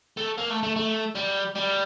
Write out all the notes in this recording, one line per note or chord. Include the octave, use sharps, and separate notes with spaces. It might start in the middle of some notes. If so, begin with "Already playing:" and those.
A3
A#3
A3
A3
A3
G3
G3